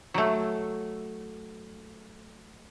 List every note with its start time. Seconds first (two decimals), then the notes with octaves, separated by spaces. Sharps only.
0.14 F#3 A3